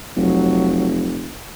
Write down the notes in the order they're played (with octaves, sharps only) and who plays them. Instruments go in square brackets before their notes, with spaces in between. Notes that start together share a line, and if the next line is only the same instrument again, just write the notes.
[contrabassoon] F1 [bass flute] F#3